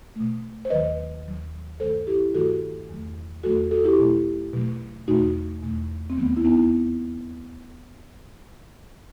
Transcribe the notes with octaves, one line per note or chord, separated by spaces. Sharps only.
B2 A3
C5
D#2 D#3 F#3 B4 D#5
D#2 D#3 F#3
G2 D#3 F#3 A3 A4 C5
E4 G4
G2 D#3 F#3 A3 F#4 A4
E2 D#3 F#3 A3
E2 D#3 F#3 A3 F#4 A4
F#4 A4
E4 G4
B2 F#3 A3
B2 F#3 A3
E2 B2 A3 D#4 F#4
E2 B2 A3
C4
D#2 D#3 F#3 A3 B3
E4
B3 D#4